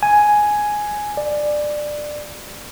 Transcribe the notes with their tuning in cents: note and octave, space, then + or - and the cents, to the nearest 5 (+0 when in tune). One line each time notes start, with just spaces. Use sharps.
G#5 +5
D5 +15